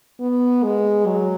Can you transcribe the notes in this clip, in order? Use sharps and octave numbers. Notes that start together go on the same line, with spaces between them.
B3
G#3
F#3